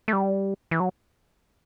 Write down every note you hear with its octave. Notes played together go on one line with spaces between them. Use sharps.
A3
G3
E3
F#3